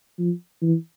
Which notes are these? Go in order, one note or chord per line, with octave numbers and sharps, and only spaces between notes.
F3
E3